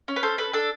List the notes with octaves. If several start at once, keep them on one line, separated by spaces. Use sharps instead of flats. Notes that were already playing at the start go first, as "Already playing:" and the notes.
C#4
B4
A4 C5
A4 B4
D4 A4